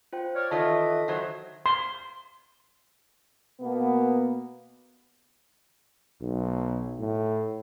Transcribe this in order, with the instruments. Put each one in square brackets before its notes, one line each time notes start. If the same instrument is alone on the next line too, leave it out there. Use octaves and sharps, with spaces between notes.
[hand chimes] F4 C5 G5
[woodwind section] C#5 D5 F6
[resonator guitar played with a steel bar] D#3 E3 F4 [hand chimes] A4 C#5 A5 [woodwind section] D#5 E5
[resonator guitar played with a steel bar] D#3 F#3 C5
[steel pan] C6
[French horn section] B2 A#3 B3
[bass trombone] B1
A2